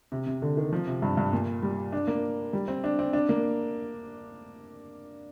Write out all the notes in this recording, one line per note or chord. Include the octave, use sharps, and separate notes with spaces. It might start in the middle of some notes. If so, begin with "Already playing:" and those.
C3
C3
D3
D#3
F3
C3
G2
G2
A#2
G3
D4
A#3
G3
C4
D4
C4
D4
A#3